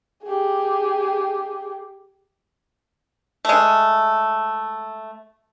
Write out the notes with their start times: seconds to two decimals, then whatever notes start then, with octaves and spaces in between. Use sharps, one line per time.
0.23 G4 G#4
3.45 G#3 A3